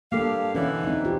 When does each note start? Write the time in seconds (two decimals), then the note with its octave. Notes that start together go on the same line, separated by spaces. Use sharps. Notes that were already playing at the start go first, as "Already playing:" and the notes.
0.12 G2 A#3 G4 A4 F5
0.55 B2 D3 E3 C#4
0.84 C4 D#4
1.05 F4 G4